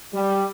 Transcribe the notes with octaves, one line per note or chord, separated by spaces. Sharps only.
G3